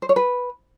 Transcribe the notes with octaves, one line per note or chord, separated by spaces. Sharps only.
C5
C#5
B4